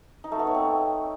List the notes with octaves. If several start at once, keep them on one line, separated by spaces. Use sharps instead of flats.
D#4
A3
B3
C#5
C4